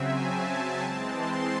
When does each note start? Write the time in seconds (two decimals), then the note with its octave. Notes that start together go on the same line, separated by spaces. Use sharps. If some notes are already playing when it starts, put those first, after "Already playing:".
Already playing: C#3 F#3 C4 E5 G#5
0.21 A5
0.82 E3 G#3 C4
1.11 C6